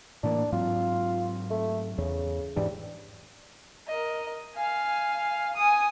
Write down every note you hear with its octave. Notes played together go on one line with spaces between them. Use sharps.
A2 E3 A#3 D4
G#2 F#3 C4 F4
A3
E2 C#3
G#2 E3 G3 D4
A#4 D#5
F5 G#5
G#5 D#6